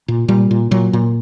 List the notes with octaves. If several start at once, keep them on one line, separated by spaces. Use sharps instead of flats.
A#2
A#2 G3
A#2
A#2 F#3
A#2